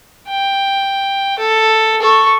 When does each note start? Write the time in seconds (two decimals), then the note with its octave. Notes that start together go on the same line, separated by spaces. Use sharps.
0.28 G5
1.38 A4
2.02 A4 C#6